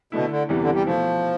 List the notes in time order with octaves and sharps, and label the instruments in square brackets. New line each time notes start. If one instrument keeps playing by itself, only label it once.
[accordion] B2 [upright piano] D3 A3 E4
[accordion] D3
[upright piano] E2 C3 E3 G3 B3
[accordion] D3
G3
[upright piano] B2 A3 E4 [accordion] F3